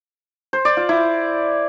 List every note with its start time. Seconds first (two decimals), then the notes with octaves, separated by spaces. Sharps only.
0.53 C5
0.65 D5
0.77 F4
0.89 E4